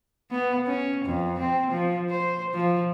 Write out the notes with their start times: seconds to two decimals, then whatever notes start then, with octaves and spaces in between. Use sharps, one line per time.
0.31 B3
0.67 C#4
1.05 F2
1.39 C4
1.72 F3
2.10 C5
2.54 F3